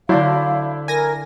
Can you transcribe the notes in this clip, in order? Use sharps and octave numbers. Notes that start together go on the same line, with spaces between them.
D3 F#3 D4 E4 C5 F5
A#4 G#5 A#6